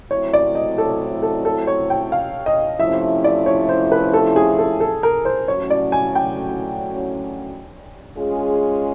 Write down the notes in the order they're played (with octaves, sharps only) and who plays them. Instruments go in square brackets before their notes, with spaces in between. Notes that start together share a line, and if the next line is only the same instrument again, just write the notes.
[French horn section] F#3 A3 C4 E4 [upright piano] C#5
[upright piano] D5
D#5
A4
A4
A4
C#5
G5
F5
D#5
[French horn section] C3 F3 A3 C#4 E4 [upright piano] E5
[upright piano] D5
C#5
C5
B4
A4
G#4
A4
A4
A#4
C5
[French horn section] A2 F#3 A3 C#4 F#4 [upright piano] C#5
[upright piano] D5
G#5
G5
[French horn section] G#3 C#4 F4 G#4